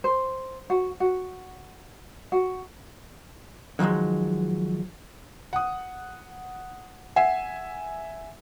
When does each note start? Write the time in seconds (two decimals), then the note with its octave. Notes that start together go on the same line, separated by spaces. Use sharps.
0.04 C5
0.70 F#4
1.00 F#4
2.32 F#4
3.79 D3 D#3 F3 F#3 G#3
5.53 F#5 D#6
7.16 E5 F#5 G#5